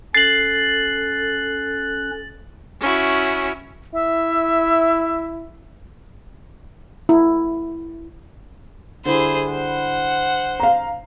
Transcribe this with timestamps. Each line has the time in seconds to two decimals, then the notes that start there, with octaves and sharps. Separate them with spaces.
0.15 C#4 A4 F#6 A6 C7 F#7
2.80 C#4 E4 F#4
3.94 E4 E5
7.09 E4
9.05 D3 G3 E4 G#4 C5
9.49 C5 F#5
10.60 F5 A#5